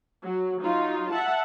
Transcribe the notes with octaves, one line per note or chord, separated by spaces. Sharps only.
F#3
F#3 D#4 F4
E5 F#5 A5